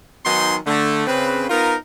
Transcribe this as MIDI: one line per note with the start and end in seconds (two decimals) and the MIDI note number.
0.25 0.56 51
0.25 0.56 54
0.25 0.56 59
0.25 0.56 63
0.25 0.56 80
0.25 0.56 84
0.66 1.04 50
0.66 1.04 57
1.07 1.45 49
1.07 1.45 60
1.07 1.45 71
1.50 1.74 59
1.50 1.74 63
1.50 1.74 65
1.50 1.74 70